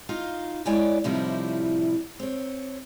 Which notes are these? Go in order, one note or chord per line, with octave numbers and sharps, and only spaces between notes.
D#4 F4 F5
G#3 E4 C#5 D5 G5 G#5
A2 C3 F3 G3 D#4 E4
C4 C#5